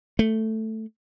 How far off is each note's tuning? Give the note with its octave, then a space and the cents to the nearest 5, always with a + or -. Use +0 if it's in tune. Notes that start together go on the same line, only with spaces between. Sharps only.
A3 +5